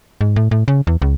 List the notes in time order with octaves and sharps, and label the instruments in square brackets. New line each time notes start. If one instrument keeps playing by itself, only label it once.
[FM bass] G#2
A2
A2
C#3
E2
C#2